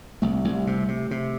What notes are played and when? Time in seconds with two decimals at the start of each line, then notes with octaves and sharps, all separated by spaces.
0.22 C2 A3
0.44 C2
0.67 C3
0.88 C3
1.11 C3